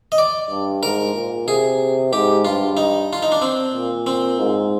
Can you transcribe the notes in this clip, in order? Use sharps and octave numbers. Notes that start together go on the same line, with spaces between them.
D#5
D5
G2
G#2 A#4
A#2
C3 G#4
G#2 G4
G2 F4
D#4
F4
D#4
D4
C4
A#2
C4
G#2